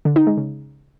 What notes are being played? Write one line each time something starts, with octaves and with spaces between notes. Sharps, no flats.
D3
D#4
G#3
C#3